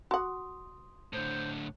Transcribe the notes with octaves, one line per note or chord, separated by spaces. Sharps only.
F#4 F#5 C6 D#6
A2 D3 C5